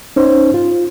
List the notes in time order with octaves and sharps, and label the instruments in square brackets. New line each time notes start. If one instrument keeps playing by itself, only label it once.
[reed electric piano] C#4 D#4 C5
F4